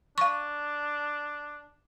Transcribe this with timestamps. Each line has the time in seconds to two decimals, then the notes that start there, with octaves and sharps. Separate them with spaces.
0.18 D4 F5 C#6